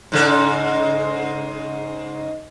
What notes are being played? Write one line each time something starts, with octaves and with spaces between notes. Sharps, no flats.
G#2 C#3 A4